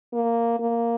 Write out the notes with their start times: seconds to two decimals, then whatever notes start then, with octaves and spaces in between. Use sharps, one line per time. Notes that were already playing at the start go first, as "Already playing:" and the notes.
0.13 A#3
0.59 A#3